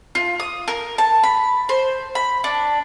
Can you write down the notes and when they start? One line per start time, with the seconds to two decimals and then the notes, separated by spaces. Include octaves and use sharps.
0.15 F4
0.40 D#6
0.68 A#4
0.98 A5
1.24 B5
1.69 C5
2.15 B5
2.44 D4